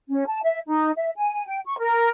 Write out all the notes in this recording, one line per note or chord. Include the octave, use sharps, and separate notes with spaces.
C#4
A5
E5
D#4
E5
G#5
G5
C#6
A#4